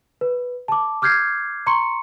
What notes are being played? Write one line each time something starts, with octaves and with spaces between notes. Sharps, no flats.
B4
A5 D6
D6 F6 G6 G#6 C7
A#5 C6 C#6 C#7